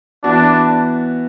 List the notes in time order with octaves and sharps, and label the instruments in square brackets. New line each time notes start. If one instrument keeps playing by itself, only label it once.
[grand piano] E3 B3 F#4 [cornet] D4